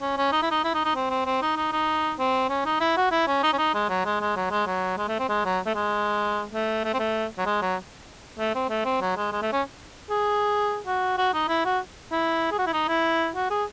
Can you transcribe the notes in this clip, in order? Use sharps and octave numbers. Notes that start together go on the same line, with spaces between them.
C#4
C#4
D#4
E4
D#4
E4
D#4
D#4
C4
C4
C4
D#4
D#4
D#4
C4
C#4
D#4
E4
F#4
E4
C#4
D#4
C#4
D#4
G#3
F#3
G#3
G#3
F#3
G#3
F#3
G#3
A3
C4
G#3
F#3
A3
G#3
A3
A3
C4
A3
F#3
G#3
F#3
A3
C4
A3
C4
F#3
G#3
G#3
A3
C#4
G#4
F#4
F#4
D#4
E4
F#4
E4
G#4
F#4
E4
D#4
E4
F#4
G#4